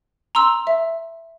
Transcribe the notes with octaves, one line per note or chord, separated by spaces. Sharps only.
A#5 C6 E6
E5